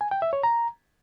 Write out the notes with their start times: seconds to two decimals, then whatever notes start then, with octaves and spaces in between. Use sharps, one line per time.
0.01 G#5
0.11 G5
0.22 E5
0.33 C#5
0.43 A#5